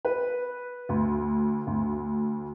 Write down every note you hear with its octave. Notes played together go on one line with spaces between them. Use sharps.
B4
D2
D2